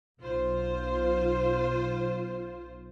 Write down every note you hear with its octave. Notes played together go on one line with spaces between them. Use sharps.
B1 F4 C5